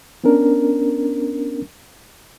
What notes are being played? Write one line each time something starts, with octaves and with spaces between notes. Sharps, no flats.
B3 C#4 D4 A#4